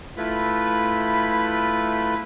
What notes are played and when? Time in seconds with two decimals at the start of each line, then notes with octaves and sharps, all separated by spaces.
0.17 A3 E4 F4 B4 B5